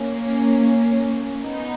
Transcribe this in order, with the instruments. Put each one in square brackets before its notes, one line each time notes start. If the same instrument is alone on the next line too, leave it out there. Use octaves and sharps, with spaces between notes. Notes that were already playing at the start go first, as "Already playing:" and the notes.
Already playing: [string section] A#3 C#4
B3 D#4